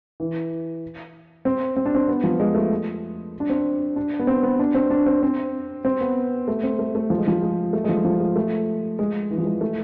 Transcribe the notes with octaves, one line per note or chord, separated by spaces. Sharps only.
E3
C4
C4
D4
C4
B3
F3
G#3
A3
D4
C4
D4
B3
C4
B3
D4
C4
D4
C4
C4
C4
B3
A3
C4
A3
A3
F3
G#3
F3
G#3
A3
G#3
F3
F3
G#3
A3
G#3
E3
F3
G#3
A3